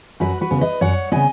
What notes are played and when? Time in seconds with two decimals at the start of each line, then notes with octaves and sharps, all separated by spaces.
0.20 F#2 F#4 B4
0.41 F#4 B4
0.51 C#3 B3
0.61 B4 D#5
0.81 F#2 C#5 F#5
1.12 C#3 B3 D#5 G#5